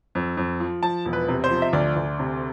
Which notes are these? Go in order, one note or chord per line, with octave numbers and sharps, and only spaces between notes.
F2
F2
F3
F3 A5
E1
B4
C3
C5
F3
E5
D2 D5
D2
C3